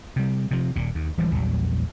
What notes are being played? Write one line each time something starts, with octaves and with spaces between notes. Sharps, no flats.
C3 G3
C3 F3
D#1 A#2
D#2
D1 E3 G3 G#3
A#1 E2 F#3 G3